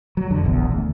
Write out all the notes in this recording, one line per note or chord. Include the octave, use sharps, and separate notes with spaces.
F#3
F2 D3
E1 A#1 E2
D2